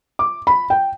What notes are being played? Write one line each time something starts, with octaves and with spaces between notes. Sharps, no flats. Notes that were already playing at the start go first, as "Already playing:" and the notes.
D6
B5
G5